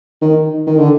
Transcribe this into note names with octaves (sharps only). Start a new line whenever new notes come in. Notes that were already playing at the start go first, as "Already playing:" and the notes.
D#3
D#3
D3